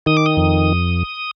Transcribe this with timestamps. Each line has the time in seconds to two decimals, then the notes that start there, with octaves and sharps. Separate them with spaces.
0.06 D#3 D#6
0.17 D6
0.26 D#6
0.37 F2